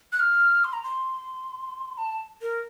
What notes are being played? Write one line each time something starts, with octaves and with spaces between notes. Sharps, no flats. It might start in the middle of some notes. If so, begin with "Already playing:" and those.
F#6
F6
C6
A#5
C6
A5
A#4